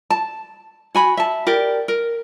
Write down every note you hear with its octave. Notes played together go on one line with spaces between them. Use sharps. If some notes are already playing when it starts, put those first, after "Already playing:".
A5
F#4 G#5 B5
E5 A5
G4 A#4 D5
A#4